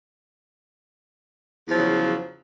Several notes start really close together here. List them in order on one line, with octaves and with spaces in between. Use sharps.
E2 F3 F#3 C#3